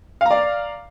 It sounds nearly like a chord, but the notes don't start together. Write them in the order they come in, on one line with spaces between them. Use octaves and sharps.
F5 A#5 D5